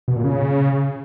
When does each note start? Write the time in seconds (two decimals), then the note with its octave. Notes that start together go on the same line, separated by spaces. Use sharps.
0.08 B2
0.16 A#2
0.24 C#3